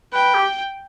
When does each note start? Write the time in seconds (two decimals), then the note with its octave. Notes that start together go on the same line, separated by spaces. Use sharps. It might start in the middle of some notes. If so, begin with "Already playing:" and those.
0.13 B4 G5
0.34 G4